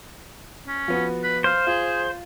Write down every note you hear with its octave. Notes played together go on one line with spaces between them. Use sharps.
C#4
F3 B3 F#4
B4
C5 F5
F4 G#4